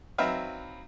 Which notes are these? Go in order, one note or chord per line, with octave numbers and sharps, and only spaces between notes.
F#3 C4 D#4 B4 E5 F5